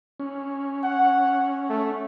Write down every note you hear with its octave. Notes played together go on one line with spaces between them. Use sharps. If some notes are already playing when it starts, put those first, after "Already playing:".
C#4
F#5
A3